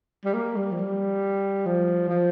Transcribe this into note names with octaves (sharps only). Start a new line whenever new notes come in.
G3
A#3
G3
F3
G3
F3
F3